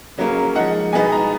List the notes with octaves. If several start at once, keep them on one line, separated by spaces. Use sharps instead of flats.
C#3 F#3 A#3 C#4
F3 G#3 D#4 F#5
B2 G#3 B3 D#4 G#5
A#5